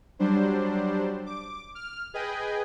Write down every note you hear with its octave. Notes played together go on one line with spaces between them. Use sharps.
F#3 G3 D4 C5
D6
F6
G#4 B4 D#5 G5 G#5